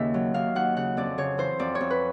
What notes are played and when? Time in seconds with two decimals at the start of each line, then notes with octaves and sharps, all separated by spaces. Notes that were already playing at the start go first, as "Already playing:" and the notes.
Already playing: D#2 C#3 E5
0.14 F#3
0.34 D#2 F5
0.55 D#2 F#5
0.76 C#3 F#5
0.97 F2 D5
1.18 C#3 C#5
1.38 E3 C5
1.59 F2 D5
1.75 C#5
1.81 F2
1.90 B4